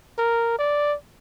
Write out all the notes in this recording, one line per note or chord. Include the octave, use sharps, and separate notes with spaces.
A#4
D5